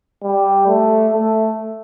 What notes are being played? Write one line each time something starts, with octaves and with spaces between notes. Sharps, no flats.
G3
A3
A3